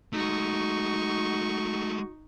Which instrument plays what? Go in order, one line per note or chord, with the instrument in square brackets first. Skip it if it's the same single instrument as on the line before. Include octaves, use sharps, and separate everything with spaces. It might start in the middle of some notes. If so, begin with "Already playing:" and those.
[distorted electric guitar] G#3 A3 [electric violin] D#4 C#6 [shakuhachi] F#4